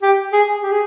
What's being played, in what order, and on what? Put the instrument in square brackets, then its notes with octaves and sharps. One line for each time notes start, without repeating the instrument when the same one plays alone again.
[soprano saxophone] G4
G#4
G4
G#4